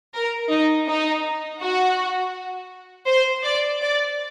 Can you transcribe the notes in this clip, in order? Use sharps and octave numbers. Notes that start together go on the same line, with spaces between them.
A#4
D#4
D#4
F#4
C5
D5
D5